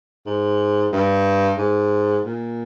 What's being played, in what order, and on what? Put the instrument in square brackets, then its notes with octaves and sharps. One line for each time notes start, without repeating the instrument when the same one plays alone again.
[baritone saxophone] G#2
G2
G#2
A#2